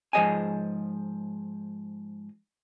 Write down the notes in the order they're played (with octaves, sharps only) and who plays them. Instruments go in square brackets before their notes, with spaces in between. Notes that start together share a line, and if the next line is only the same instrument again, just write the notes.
[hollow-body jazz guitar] G#2 F3 G#4 D#5 F5 G#5